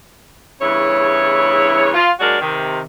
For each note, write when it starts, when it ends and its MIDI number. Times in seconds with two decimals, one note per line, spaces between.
0.61 1.90 40
0.61 1.90 43
0.61 1.90 49
0.61 1.90 64
0.61 1.90 73
1.94 2.10 65
2.20 2.40 54
2.20 2.40 56
2.20 2.40 62
2.20 2.40 66
2.20 2.40 70
2.20 2.40 74
2.40 2.80 48
2.40 2.80 51